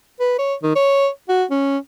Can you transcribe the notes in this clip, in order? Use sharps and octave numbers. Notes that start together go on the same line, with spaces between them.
B4
C#5
D#3
C#5
F#4
C#4